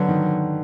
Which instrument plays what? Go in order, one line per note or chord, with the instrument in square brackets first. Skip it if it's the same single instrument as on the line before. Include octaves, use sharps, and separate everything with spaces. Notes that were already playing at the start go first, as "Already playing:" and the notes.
Already playing: [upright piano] D3 B3 [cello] F#3
[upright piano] D#3